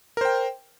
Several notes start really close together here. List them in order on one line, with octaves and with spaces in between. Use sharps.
A#4 C5 G5